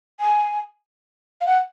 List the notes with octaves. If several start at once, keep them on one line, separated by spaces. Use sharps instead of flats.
G#5
F5
F#5